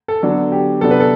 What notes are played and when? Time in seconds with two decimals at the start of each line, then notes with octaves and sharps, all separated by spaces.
0.08 A4
0.23 D3 F#3 B3 D4 A4
0.52 G4
0.81 C3 F#3 B3 D4 A4
0.91 B4
1.00 A4